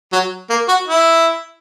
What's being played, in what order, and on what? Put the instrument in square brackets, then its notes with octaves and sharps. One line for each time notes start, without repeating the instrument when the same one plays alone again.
[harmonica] F#3
A#3
F#4
E4